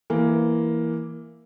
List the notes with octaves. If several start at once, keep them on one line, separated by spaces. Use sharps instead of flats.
E3 A#3